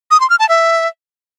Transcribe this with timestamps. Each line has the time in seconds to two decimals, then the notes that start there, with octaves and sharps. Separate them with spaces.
0.11 D#6
0.20 C6
0.30 F6
0.39 A5
0.49 E5